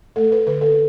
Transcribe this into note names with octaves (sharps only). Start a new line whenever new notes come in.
A3 A4
B4
D3 B4
A4